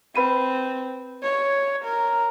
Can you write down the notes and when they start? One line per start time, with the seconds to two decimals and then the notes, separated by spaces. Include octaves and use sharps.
0.16 C4 B4 B5 D#7
1.23 C#5
1.85 A#4